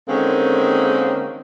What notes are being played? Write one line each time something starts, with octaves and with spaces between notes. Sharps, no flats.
D3 D#3 G#3 A#3 C4 C#4